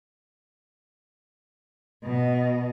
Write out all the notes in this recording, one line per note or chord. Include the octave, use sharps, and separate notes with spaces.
B2 D#5